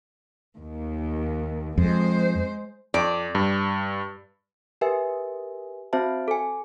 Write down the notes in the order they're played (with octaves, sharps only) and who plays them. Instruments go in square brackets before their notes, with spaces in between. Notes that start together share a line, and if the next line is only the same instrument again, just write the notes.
[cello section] D#2
[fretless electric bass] F2 [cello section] G#3 C5
[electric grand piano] F2 [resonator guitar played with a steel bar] D5
[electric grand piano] G2
[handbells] G4 A#4 B4 E5 G#5
C4 F#4 C5 E5 A5
A4 G#5